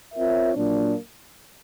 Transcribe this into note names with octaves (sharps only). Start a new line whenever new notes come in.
C4 F4 A#4 C#5 E5
A#2 F#3 A#3 D4